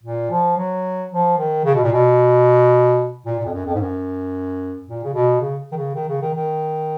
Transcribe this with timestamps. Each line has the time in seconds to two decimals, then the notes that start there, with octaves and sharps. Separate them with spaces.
0.03 A#2
0.31 F3
0.57 F#3
1.11 F3
1.37 D#3
1.65 C#3
1.75 B2
1.83 A#2
1.92 B2
3.26 A#2
3.39 A#2
3.45 F2
3.53 F#2
3.66 F2
3.75 G#2
3.80 F#2
4.88 A#2
5.04 C#3
5.13 B2
5.40 C#3
5.72 D#3
5.76 C#3
5.94 D#3
6.08 C#3
6.21 D#3
6.34 D#3